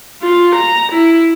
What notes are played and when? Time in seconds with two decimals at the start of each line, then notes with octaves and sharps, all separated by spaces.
0.22 F4
0.55 A#5
0.92 E4